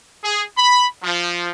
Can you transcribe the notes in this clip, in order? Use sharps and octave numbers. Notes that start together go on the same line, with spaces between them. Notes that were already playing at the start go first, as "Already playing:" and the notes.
G#4
B5
F3